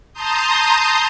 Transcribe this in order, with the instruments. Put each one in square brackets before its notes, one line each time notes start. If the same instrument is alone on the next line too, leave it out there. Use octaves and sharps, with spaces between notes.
[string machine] A5 A#5 C6 D#6 G6